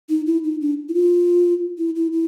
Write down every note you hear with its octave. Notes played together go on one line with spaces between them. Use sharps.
D#4
E4
D#4
D4
E4
F4
E4
E4
E4